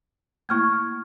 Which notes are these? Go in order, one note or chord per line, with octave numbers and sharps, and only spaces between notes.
A3 A#3 E4 C#6 F6 G#6